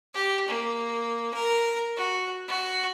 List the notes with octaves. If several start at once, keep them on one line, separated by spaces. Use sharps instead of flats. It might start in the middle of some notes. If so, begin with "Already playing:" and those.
G4
A#3
A#4
F#4
F#4